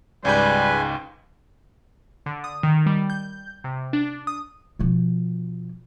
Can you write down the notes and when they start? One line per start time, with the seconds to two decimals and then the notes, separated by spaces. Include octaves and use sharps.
0.25 C#2 G#2 G3 B4 G#5 G6
2.26 D3
2.44 D#6
2.63 D#3
2.86 G3
3.10 G6
3.64 C3
3.93 D4
4.27 D#6
4.79 B2 F3